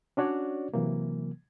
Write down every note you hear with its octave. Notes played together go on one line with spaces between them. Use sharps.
C#4 D4 F#4 C#5 D5
C3 E3 F#3 A#3